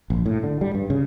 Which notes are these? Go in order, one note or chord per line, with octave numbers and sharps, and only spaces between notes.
A#1
A2
D3
G3
G2
C#3